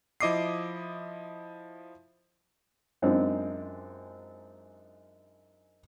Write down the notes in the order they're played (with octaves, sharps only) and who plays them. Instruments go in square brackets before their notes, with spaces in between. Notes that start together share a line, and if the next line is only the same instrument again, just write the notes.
[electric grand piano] F3 E4 D#5 D6 D#6 C7
[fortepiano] F#2 G#3 C4 D4 D#4 F4